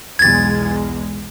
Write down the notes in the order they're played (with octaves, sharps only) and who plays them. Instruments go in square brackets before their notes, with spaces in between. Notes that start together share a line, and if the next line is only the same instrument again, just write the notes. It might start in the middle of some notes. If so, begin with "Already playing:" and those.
[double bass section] B1 E2 G#3 [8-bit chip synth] G#6 A6